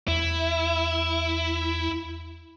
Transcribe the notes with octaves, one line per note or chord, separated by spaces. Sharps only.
E2 E4